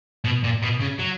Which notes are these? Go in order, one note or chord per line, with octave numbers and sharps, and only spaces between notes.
B2
A#2
B2
C#3
F#3